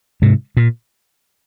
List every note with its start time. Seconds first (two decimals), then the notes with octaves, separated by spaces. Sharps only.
0.22 G#2 C3
0.57 A#2